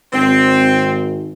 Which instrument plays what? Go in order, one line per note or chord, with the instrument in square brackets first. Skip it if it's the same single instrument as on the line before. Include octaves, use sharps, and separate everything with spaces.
[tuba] G#1 [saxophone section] C4